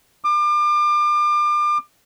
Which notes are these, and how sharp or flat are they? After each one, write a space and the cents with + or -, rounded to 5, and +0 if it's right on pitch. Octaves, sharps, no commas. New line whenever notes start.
D6 +35